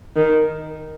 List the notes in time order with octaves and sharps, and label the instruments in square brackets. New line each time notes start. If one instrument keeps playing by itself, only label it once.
[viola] D#3